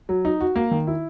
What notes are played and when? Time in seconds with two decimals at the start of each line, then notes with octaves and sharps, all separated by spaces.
0.09 F#3
0.25 D#4
0.41 F#4
0.56 A#3
0.71 D#3
0.87 E4